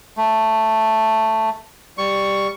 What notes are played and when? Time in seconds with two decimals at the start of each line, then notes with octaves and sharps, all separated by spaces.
0.17 A3
1.98 G3 C#6